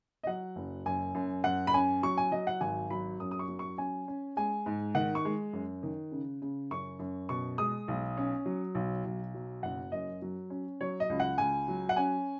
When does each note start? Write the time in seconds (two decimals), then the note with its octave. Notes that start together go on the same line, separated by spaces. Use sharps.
0.23 D#5
0.27 F#3 F#5
0.56 F#1
0.86 F#2 G#5
1.15 F#2
1.44 F#2 F#5
1.67 B5
1.74 C#4 G#5
2.03 F#3 C#6
2.18 G#5
2.32 F#3 D#5
2.47 F#5
2.61 G#1 G#5
2.90 F#3 B5
3.20 F#2 D#6
3.31 D#6
3.39 C#6
3.48 F#3
3.59 C#6
3.78 C#4 G#5
4.08 C#4
4.37 G#3 G#5
4.66 G#2
4.95 D#3 F#5
5.15 C#6
5.25 G#3
5.53 F#2
5.83 D#3
6.12 C#3
6.42 C#3
6.71 F#2 C#6
6.99 F#2
7.29 B2 C#6
7.58 G#3 D#6
7.88 B1
8.17 C#4
8.45 F#3
8.75 B1
9.05 B1
9.34 F#3
9.63 F#1 F#5
9.92 F#2 D#5
10.22 F#3
10.50 C#4
10.81 F#3 C#5
11.00 D#5
11.10 C#2
11.20 F#5
11.38 C#2 G#5
11.68 F#3
11.89 F#5
11.96 C#4 G#5